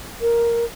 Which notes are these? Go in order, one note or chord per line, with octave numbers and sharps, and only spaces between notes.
A#4